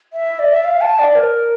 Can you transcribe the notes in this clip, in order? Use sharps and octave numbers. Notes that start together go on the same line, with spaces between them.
E5
D5
E5
F5
A5
D5
A#4